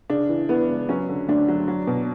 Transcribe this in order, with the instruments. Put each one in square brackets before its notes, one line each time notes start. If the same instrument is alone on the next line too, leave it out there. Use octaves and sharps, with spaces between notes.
[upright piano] C#3 D4
E3
E3 B3
C#2
F#3 C#4
D3
D2 D4
F#3
F#3
B2